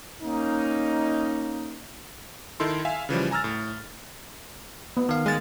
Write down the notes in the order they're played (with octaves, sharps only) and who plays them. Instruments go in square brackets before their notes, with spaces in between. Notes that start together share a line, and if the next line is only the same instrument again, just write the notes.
[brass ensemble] A#3 C#4 D#4
[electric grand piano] D#3 D#4 E4 A4 C6
E5 F5 G#5
C#3 E3 F3 G3
G#5 A#5 E6 F6 A6
A2
[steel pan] B3
[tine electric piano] D#3 F5
[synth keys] G#3 A6